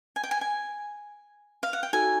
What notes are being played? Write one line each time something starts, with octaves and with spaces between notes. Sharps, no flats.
G#5
G5
G#5
G#5
F5
F#5
G5
D#4 F#4 A4 G#5